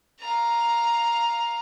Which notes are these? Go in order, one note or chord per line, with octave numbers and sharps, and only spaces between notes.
F5 A#5